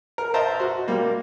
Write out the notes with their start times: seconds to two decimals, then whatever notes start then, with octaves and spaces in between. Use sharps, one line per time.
0.18 A#4
0.34 C5 D#5 E5 A5 A#5
0.59 F#4 C6
0.88 G3 A#3